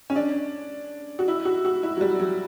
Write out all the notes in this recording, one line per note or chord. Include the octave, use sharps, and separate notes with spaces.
C#4
D4
F#4
E4
F#4
F#4
E4
F#3
G3
F#3